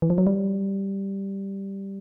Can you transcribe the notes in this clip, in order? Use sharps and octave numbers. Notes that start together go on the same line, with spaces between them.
E3
F3
F#3
G3